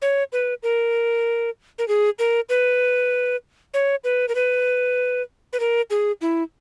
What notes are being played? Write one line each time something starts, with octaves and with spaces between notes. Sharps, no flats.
C#5
B4
A#4
A#4
G#4
A#4
B4
C#5
B4
A#4
B4
B4
A#4
G#4
E4